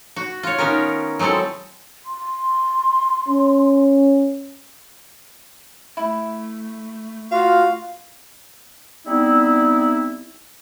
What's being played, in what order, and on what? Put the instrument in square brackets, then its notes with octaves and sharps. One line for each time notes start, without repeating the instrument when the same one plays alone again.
[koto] F#4
F4 C#5
D#3 B3 C#4 A#4
F#3 G#3 C4 E4 A4
[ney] C6
[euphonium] C#4
[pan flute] A3 [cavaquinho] E4
[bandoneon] F4 F#4 [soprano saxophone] F5
[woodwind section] G3 B3 C4 D#4 E4